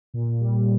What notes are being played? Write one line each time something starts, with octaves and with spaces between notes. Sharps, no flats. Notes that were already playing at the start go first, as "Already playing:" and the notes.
A#2
G3